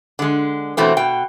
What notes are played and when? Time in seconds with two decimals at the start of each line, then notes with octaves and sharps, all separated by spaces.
0.19 D3 G#3
0.77 B2 E3 A3 C4
0.97 B2 G5